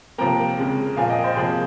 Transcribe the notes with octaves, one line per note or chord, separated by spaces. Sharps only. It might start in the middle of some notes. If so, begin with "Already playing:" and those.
C3 F3 A#3 G5 A#5
F2 C#3 G#3
A#2 F3 A#3 F5 G#5
D#5 G5
C5 D#5
C3 F3 A#3 G#4 C5